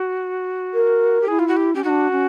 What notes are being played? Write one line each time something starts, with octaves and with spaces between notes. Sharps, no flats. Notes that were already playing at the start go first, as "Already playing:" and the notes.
Already playing: F#4
A#4
G4
E4 G#4
F4
F#4
G4
C#4 G4
D4 D#4 F#4
C#4